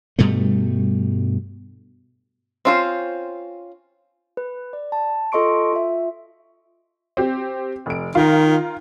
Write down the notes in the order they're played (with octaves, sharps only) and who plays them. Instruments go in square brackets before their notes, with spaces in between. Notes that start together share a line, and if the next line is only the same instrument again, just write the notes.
[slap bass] G2 B2 G3 A3
[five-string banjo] C4 C#4 F4 A#4 C5
[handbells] B4
D5
A5
F4 A4 D#5 C6 C#6 D7
F4 E5
[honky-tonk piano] C4 G4
F1 D7
[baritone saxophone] D#3 [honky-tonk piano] F4 A#4